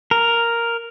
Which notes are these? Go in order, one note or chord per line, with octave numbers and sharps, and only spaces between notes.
A#4